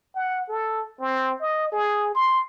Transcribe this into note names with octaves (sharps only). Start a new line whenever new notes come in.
F#5
A4
C4
D#5
G#4
C6